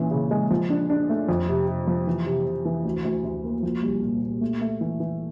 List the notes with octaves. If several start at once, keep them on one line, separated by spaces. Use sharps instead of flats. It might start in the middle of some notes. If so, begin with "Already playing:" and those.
Already playing: A#2 E3 C#4
C#3
G#3
F3
D4
D4
A3
F2
C3
C3
F3
E3
C3
C3
E3
D2
D2
D2
A#3
F3
C2
A#2
A#2
A3
A3
E3
E3